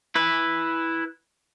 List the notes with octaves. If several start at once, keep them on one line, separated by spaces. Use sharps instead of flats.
E4 B4